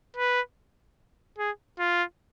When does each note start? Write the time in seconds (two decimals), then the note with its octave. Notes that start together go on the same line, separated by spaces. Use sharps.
0.17 B4
1.39 G#4
1.79 F4